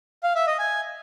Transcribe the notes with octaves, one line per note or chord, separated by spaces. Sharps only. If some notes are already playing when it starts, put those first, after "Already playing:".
F5
E5
D#5
G#5